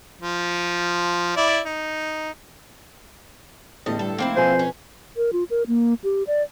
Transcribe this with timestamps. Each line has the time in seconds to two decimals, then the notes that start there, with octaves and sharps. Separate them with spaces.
0.21 F3
1.37 E4 D5
1.66 D#4
3.86 E2 A2 D3 G3 D#5
3.99 G2 A4
4.18 F1 A#3 C4 E4
4.36 F2 B2 B4 C5 G#5
4.59 C#4
5.17 A#4
5.33 F4
5.50 A#4
5.67 A#3
6.04 G4
6.27 D5